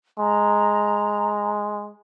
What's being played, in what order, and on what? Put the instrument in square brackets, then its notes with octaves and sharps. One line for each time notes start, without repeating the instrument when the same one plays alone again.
[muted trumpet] G#3 [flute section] A#5